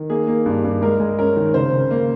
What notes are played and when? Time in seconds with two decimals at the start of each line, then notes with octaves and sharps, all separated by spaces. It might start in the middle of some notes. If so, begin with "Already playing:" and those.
Already playing: D#3
0.10 A#3 G#4
0.27 A#3
0.46 G2
0.64 G2
0.81 G#3 A#4
1.00 G#3
1.18 C#4 A#4
1.36 D#3
1.54 C#3 C5
1.72 C#3
1.91 A#3